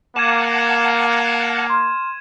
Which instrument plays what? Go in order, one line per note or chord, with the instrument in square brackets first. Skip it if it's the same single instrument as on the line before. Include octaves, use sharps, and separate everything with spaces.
[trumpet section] A#3 [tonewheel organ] F#5 A5 [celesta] D6 [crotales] G#6 D#7 E7
[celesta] C6 F6